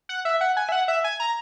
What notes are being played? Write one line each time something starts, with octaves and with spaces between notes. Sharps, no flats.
F#5
E5
F#5
G#5
E5
F#5
E5
G#5
A#5